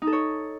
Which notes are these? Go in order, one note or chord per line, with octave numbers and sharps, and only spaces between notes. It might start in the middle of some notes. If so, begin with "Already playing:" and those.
D#4
A4
C#5